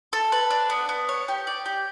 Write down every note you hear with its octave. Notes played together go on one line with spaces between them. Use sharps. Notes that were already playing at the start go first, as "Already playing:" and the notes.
A4
B4
D4
B3
B3
C#5
G4
D5
G4